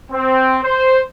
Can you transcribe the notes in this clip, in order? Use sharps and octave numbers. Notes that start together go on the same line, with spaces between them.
C4
C5